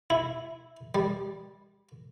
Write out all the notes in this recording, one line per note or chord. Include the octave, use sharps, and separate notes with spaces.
E4
G3